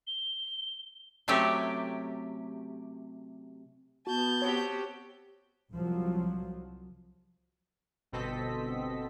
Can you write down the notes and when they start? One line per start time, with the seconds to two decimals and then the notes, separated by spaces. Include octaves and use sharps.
0.07 G7
1.28 C3 F#3 A3 C#4 G4
4.07 B3 F#4 A5 G6
4.42 C4 F#4 G4 C#5
5.73 C2 F3 F#3
8.12 G1 B2 C4 A4 D#5 B6